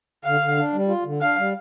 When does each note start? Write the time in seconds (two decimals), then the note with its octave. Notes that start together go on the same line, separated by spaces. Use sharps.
0.24 D3 F5
0.40 D3
0.57 D4
0.73 G3
0.88 F4
1.05 D3
1.21 D4 F5
1.37 G3